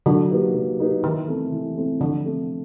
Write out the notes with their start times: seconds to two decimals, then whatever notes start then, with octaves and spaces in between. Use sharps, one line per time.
0.06 D3 F#3
0.30 A#3 D#4 G4 B4
0.54 F#3
0.79 A#3 D#4 G4 B4
1.03 D#3 E3
1.28 A3 C4
1.52 E3
1.76 A3 C4
2.00 D3 F3
2.25 A3 C4